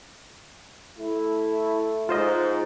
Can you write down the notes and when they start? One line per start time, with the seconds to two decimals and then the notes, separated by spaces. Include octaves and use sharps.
0.99 A3 E4
2.09 G#2 F4 C5 D#5